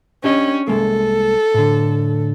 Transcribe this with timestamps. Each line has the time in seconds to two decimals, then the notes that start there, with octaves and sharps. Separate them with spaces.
0.24 C#4 D4 G4 D#5
0.68 C2 G#3 A#3 A4
1.54 A2 D3